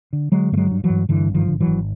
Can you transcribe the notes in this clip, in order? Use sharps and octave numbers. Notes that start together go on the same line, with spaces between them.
D3
D3 F#3 G#3
G2 A3
F#3 G#3
G2
E3 F#3
G2
G2 D3 E3
G#1
D#3 F3
D3
E3 F#3
G#1